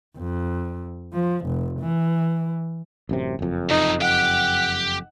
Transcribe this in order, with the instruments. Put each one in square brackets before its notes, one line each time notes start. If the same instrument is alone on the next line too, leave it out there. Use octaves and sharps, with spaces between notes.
[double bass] F2
F3
F1
E3
[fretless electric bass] A1 F#2 C3
F#1 F2
[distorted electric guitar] A2 C3 [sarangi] D#4
[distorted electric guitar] G4 G5 [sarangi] F#5